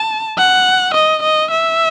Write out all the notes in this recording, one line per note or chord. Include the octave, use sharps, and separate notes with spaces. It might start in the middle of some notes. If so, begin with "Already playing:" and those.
Already playing: A5
F#5
D#5
D#5
E5